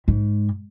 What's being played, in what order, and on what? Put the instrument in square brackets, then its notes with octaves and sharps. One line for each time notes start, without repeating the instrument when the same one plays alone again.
[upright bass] G#2